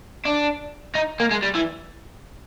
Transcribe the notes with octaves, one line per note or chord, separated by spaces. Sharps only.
D4
D#4
A#3
G#3
G3
E3